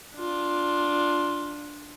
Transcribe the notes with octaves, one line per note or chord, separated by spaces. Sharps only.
D4 F4